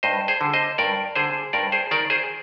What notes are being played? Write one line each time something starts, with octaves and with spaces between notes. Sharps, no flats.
G2 C5 D#5
G#4 C5
D3
C5 D#5
G2 A#4 D5
D3 G#4 C5
G2 A#4 D5
G#4 C5
D#3 A#4 D5
G#4 C5